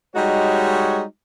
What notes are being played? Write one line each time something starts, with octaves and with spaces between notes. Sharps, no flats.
G3 G#3 D#4 F#4 C#5